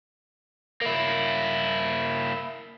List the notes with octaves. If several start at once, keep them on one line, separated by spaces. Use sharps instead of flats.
A#3 E4